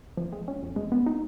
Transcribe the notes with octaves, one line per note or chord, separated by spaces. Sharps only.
F3
G#3
C#4
F2
G#3
B3
D#4